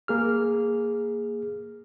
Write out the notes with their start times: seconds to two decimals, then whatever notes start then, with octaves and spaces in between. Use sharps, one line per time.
0.08 A#3 G#4 F6